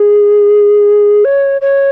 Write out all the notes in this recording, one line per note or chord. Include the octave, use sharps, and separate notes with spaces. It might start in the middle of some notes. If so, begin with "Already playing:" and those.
Already playing: G#4
C#5
C#5